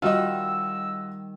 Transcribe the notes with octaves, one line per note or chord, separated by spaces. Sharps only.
D#3 G3 F4 F#4 D#5 E6